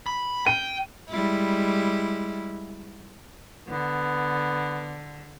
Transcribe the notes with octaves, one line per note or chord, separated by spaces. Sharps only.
B5
G5 D#7
G3 G#3 E4
D3 B3